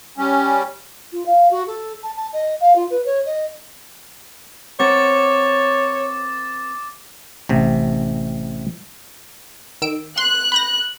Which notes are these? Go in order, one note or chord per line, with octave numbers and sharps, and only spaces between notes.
G3 C#4
F4
F5
F#4
A4
A5
A5
D#5
F5
F4
B4
C#5
D#5
C4 A#4 C#5 F#5 D6 A6
A1 C3
D#3 E6 D7
C6 F#6
B5 G6 A#6